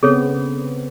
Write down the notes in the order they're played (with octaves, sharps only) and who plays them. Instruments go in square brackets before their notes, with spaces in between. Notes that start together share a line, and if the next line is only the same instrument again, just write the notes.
[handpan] C#3 B3 C4 [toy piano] G#4 A4 C#5